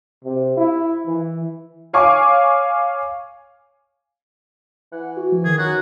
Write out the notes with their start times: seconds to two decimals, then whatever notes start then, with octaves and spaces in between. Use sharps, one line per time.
0.24 C3
0.57 E4
1.07 E3
1.93 C#5 F5 G#5 C#6 D6
4.92 E3 F#5
5.17 F#4
5.32 F3
5.45 D#3 G#4
5.58 F#2 F#4